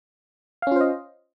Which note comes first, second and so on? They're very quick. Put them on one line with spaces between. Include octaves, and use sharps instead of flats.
F5 C#4 F4 C5 D#5